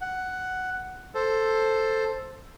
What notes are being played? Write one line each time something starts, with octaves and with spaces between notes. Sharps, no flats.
F#5
A4 C5